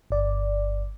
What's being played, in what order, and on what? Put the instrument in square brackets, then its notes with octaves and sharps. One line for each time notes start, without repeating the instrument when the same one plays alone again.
[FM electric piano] G1 D5